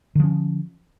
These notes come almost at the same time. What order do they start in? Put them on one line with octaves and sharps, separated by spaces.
D3 F3 C#4